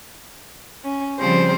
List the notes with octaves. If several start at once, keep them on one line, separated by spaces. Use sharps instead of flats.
C#4
C#3 F3 G3 C4 C5